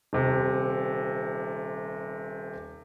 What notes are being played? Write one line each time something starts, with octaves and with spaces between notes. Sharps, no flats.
D#1 C3